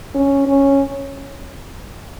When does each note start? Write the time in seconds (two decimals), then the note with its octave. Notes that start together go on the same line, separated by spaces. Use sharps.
0.15 C#4
0.47 C#4